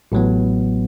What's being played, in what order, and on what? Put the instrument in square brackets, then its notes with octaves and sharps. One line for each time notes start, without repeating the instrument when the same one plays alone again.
[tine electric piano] A1 A2 F#3 B3